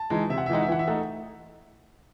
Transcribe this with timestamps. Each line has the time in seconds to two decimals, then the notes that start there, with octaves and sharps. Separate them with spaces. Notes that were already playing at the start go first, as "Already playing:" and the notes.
Already playing: A5
0.10 E3 G#3 D#4
0.29 C3 E5
0.38 F#5
0.46 E5
0.50 E3 G#3 D#4 F#5
0.63 E5
0.68 E3 F#5
0.79 E5
0.87 A3 D#4 F#5